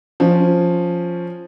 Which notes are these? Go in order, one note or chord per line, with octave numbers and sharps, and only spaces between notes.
F3 C#4